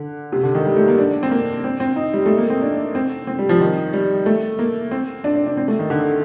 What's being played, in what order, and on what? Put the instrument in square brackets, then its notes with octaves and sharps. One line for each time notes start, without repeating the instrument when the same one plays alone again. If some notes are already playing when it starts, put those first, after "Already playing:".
Already playing: [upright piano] D3
C3
D3
D#3
G3
A3
A#3
D4
C4
A#3
C4
C4
D#4
G3
A3
A#3
C4
D4
C4
C4
G3
F3
D#3
G3
A3
A#3
C4
D4
D4
D4
C4
A3
D#3
D3